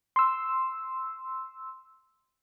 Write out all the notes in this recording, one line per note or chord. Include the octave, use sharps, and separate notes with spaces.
C6 E6